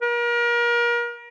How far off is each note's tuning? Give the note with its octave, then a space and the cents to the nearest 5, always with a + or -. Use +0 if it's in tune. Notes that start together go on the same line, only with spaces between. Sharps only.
A#4 +35